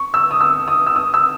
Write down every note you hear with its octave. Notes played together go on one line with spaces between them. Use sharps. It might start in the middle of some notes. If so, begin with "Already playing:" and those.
Already playing: C#6
E6
D#6
E6
D#6
E6
D#6
E6